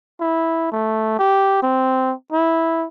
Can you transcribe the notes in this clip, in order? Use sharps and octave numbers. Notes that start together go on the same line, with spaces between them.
E4
A3
G4
C4
E4